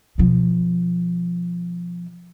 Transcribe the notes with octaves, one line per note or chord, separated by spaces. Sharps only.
B2 F3